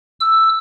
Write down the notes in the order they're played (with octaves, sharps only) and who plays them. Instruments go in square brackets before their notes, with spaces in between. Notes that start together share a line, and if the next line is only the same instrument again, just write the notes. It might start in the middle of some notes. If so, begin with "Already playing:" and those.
[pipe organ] E6